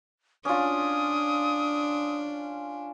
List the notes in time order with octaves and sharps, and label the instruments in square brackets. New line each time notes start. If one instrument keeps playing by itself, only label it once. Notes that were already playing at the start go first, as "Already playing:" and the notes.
[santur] C#4 F4 [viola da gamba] D4 [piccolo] D#6